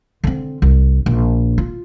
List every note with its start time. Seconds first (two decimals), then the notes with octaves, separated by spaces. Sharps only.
0.24 D3 C4
0.62 C2
1.06 A#1
1.58 F4